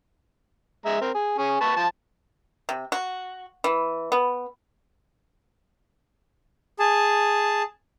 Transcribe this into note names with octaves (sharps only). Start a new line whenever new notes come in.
G#3 E5 A#5
C4 A#4
G#4
C#4 G#4
B4 A5 C#6
F3 A5
C3
F#4
E3
B3
G#4 A5